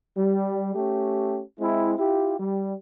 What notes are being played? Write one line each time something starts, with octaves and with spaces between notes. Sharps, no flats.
G3
A3 C#4 G4
G#3 C4 E4
E4 F4 G4
G3